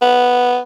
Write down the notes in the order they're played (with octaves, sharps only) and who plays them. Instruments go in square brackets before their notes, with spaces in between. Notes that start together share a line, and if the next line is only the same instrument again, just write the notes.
[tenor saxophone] B3